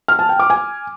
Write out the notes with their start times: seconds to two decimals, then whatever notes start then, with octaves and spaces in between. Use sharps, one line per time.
0.08 F6
0.19 A5
0.29 G5
0.39 D6
0.50 G#5